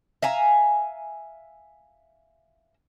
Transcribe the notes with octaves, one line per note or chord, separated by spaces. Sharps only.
E5 F5 G#5 A#5